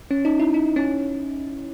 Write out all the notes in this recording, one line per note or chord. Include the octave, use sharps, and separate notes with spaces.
C#4
D#4
E4
D#4
C#4